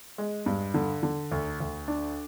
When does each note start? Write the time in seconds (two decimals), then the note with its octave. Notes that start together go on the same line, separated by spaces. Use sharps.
0.18 G#3
0.46 G2
0.74 D3
1.03 D3
1.31 D2
1.60 D2
1.88 D4